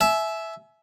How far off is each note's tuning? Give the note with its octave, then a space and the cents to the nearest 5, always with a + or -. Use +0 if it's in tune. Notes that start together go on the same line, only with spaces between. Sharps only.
E5 +0 G#5 +35